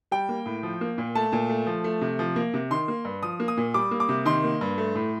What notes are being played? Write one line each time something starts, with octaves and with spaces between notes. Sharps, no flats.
G3 G5
A#3
A2
F3
A#3
A#2
A3 A5
A#2
A3
F3
A3
C3
F3
A#3
C3
D#3 C6
A#3
G2
F3 D#6
A#3
D#6
A#2
G3 D6
A#3
D6
C3
D#3 C6
A#3
G2
A3
A2